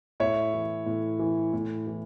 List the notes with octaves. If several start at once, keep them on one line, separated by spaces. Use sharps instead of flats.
A2 C#5 E5
E3
A2
E3
A2
E3